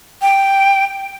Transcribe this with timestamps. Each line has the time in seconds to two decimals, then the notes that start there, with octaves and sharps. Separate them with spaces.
0.22 G5